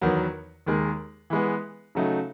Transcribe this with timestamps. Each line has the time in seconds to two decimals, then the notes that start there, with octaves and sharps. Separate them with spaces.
0.01 E2 D#3 F#3 B3
0.66 D#2 D#3 G#3
1.30 E3 G#3 B3
1.95 C#3 F#3 A3 D#4